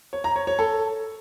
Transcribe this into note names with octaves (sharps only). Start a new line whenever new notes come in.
C#5
A#5
C#5
C#5
A4